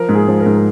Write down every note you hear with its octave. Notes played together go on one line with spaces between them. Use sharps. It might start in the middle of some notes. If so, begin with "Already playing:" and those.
Already playing: F3 A#4
G#2
G#4
F3
A#4
G#2
A#4